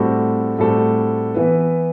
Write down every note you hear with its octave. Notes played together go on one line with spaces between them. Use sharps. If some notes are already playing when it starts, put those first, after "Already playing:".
Already playing: A2 G3 C4 F#4 A4
A2 G3 C4 F#4 A4
E3 B3 E4 B4